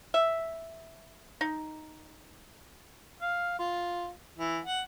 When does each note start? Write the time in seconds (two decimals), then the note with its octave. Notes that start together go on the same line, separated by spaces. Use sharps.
0.14 E5
1.41 D#4
3.22 F5
3.59 F4
4.39 E3
4.66 F#5